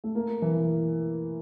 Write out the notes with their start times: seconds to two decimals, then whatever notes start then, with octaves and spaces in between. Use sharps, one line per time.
0.04 A3
0.15 A#3
0.42 E3